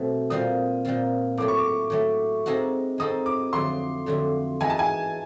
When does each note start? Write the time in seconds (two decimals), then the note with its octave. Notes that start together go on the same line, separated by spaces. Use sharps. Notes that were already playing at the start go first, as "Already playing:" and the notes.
Already playing: B2 F#3 A3 C4
0.30 A#2 G3 C4 F4 D#6
0.85 A#2 G3 C4 F4
1.37 A2 F#3 A3 D6
1.48 C#6
1.59 D6
1.90 A2 F#3 A3
2.46 G#3 C4 D#4 F#4 A4
2.98 G#3 C4 D#4 F#4 A4 D#6
3.26 D6
3.53 F2 D3 F#3 A3 C6
4.06 F2 D3 F#3 A3
4.60 E3 G#3 B3 D#4 G#5
4.70 A5
4.79 G#5